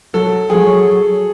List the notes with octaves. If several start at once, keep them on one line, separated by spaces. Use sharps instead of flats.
F#3 A4
F#3 G#4